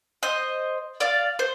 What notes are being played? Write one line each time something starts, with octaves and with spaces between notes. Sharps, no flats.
C5 D#5
D5 F5
C5